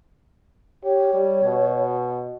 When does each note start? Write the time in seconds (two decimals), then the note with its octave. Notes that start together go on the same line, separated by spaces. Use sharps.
0.84 G4 C#5
1.14 G3
1.43 B2